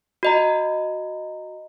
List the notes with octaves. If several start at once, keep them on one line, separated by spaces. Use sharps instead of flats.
F#4 D#5 A#5